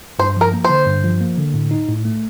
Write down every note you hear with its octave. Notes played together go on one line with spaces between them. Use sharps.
G2 C5
F3 A#4
A#3
C5
D3
G2
F3
A#3
D3
A2
D#4
A2
A3